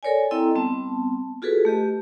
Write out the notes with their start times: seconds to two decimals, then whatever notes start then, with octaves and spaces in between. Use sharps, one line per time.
0.03 A4 A#4 C#5 D5 G#5
0.31 C4 E4 A4 D#5 G5 A#5
0.55 G3 B3 C4 A5
1.42 F4 F#4 G#4 A4 B4
1.65 A3 G4 D#5 A5